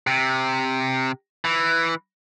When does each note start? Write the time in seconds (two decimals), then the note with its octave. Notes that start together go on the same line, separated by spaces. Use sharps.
0.07 C3
1.45 E3